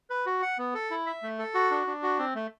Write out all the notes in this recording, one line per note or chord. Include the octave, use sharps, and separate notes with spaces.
B4
F#4
F#5
B3
A4
E4
E5
A3
A4
F#4
D4
D4
F#4
C4
A3